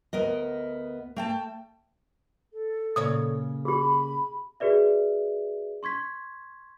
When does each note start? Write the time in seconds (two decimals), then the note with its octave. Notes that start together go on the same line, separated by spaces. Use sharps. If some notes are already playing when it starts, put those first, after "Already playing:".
0.13 D2 B3 A#4 D#5
1.16 A3 G5 A5
2.53 A4
2.96 A#2 C#3 C#5 D#6
3.65 G4 G#4 B5
4.60 F#4 G#4 B4 D5 E5
5.83 C6 C#6 G#6 B6